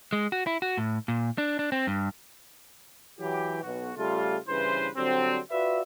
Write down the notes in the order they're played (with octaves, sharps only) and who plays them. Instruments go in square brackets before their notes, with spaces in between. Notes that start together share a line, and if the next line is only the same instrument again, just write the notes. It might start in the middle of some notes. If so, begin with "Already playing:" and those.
[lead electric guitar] G#3
F#4
E4
F#4
A2
A#2
D4
D4
C4
G2
[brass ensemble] E3 F#3 G4
B1 F#4
C#3 G3 A3 F4
G2 C#3 E3 E4 B4 C5
D3 F#3 G3 C4
F4 F#4 B4 D5 E5